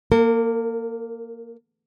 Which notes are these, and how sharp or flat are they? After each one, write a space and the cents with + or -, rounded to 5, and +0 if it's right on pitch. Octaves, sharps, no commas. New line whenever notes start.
A#3 +0 A#4 -40